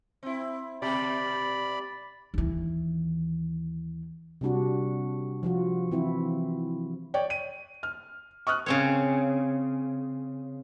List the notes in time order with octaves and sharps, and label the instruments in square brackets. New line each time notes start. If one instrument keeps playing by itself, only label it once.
[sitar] C4 E4
[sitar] B2 G3 G4 [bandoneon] D5 B5
[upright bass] D#2 E3
[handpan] C3 G3 D4 F#4
F3 F4 F#4
E3 C4 E4
[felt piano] C#5 D5 G5
D#7
F6
C#6 D#6 F6 F#6
[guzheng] C#3 C4 C#5